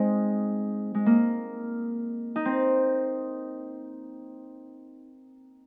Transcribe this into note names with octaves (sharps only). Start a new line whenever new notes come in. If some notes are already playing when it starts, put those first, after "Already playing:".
Already playing: G#3 C4 D#4
G#3
A#3
D#4
C4